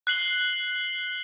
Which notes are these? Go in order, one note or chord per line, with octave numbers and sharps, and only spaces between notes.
F#6 C7 F#7 G7